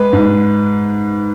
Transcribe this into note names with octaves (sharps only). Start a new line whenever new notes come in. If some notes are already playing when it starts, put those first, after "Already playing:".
Already playing: G#3 B4
G#2